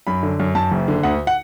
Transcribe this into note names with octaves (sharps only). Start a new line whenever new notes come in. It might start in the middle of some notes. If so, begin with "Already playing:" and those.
F#2 B5
D3
F#2
F#2 A5
F#1
D3
D2 F#5
F#5